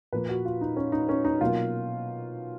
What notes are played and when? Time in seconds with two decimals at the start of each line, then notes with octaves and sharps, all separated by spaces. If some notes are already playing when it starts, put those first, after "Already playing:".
0.12 A#2 F3 A#3 B4
0.29 F#4
0.45 F4
0.61 D#4
0.76 C#4
0.92 D#4
1.09 C#4
1.25 D#4
1.41 B2 F#3 A#3 F4